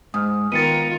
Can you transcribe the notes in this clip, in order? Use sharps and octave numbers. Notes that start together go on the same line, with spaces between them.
G#2 D#6 F6
D#3 B3 F4 A#4 A6 C#7 D#7